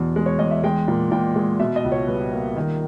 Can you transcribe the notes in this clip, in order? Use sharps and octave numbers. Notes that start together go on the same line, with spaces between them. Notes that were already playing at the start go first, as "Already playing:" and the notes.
Already playing: E2 B2
G#3
C#5
E2 D#5
E5
G#3 G5
A#2
A#2 G5
G#3
B2 E5
D#5
C#2
C#5
G3 B4
A#3
D#3 A#4